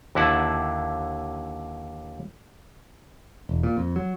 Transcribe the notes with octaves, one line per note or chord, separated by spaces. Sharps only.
D#2 D3 E4 F#5 A5
E1
A#2
F2
F#3